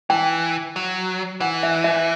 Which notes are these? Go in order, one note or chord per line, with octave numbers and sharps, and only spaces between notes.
E3 G5
F#3
E3 F#5
E5
E5